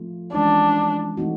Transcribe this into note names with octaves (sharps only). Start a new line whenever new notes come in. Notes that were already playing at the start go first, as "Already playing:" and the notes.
Already playing: F3 A3 C4 F4
E3 G#3 C#4 D4
E3 A3 C4 D#4 F#4